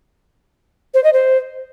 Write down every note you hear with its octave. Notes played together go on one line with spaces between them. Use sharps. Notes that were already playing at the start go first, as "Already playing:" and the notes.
C5
D#5
C5